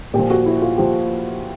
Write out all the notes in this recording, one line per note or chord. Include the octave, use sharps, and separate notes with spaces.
A#2 G4
F3
F#4
E4
F4
A#2 F3 G4